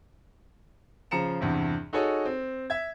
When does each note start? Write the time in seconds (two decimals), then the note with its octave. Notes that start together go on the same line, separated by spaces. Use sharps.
1.11 C#3 F3 A#5 C#7 E7
1.41 E2 G2 C3
1.93 D#4 F#4 G#4 A4 C#5 D#5
2.26 C4
2.70 E5 G#6